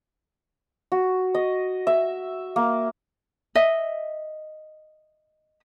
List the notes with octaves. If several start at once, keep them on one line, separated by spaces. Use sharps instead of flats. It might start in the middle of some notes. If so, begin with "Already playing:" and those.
F#4
D#5
E5
A#3
D#5 E5